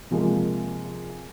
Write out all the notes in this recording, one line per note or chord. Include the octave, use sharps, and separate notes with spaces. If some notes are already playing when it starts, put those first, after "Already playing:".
C3 F3 G#3 A#3